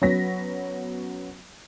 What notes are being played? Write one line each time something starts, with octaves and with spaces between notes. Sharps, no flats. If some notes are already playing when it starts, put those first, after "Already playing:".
F#3 B3 C#4 A#6 B6